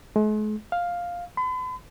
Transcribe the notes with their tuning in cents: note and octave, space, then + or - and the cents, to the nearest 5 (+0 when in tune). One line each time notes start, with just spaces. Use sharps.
G#3 +45
F5 +5
B5 +45